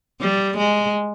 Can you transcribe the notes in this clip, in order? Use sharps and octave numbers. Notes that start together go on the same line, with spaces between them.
G3
G#3